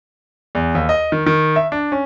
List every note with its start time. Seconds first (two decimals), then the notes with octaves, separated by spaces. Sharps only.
0.55 E2
0.75 D#2
0.89 D#5
1.12 D#3
1.26 D#3
1.56 E5
1.72 D4
1.92 C#4